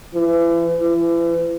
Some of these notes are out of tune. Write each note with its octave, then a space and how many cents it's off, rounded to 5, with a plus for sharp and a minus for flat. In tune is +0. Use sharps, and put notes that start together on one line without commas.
E3 +35
E3 +35